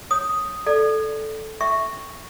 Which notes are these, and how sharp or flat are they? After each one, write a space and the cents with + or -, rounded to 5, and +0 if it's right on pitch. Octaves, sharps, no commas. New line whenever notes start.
C#5 +0 D#6 +0
A4 -5 D5 +0
E5 +0 G5 +0 C#6 +0